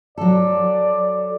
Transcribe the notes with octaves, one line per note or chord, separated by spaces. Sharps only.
F#3 A4 D5